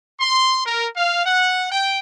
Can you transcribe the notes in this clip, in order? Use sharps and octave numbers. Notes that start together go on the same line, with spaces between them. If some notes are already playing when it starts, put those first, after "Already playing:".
C6
A#4
F5
F#5
G5